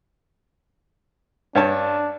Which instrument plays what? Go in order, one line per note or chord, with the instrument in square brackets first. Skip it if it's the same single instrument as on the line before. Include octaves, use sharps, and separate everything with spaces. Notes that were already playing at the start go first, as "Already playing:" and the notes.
[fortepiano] G2 C#5 A5 [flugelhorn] D4